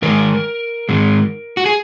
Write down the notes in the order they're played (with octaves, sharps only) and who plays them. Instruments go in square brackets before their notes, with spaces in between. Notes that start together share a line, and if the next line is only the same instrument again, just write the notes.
[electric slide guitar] G#2 D#3 G#3 A#4
G#2 D#3 G#3
F#4
G#4